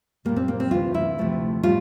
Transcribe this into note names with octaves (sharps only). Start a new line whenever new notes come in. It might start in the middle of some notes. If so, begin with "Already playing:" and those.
A#2 G3 A#3
C4
A#3
C4
D2 C3 E3 F4
E4
D2 C3 F3 A3
A2 G3 F4